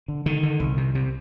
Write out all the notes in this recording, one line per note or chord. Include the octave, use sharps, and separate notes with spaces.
D3
D3 D#3
D3
C2
C3
C3